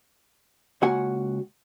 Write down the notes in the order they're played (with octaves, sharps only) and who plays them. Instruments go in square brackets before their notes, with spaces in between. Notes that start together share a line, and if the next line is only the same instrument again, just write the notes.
[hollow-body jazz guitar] C#2 A#3 F#4 F#5 G#5